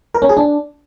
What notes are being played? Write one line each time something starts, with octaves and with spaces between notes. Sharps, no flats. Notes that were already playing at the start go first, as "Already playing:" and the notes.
A#4
C#4
G#4
D4